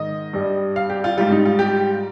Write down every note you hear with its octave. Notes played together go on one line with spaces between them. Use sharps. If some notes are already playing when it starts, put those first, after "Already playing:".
Already playing: G#2 D#3 G#3 D#5
G2 G3
F5
G4
F4
G#2 G3 F4
D#4
F4
G4